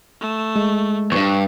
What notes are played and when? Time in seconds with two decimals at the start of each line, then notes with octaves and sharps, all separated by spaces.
0.21 A3
0.56 G#3
1.12 E2 G2 C#6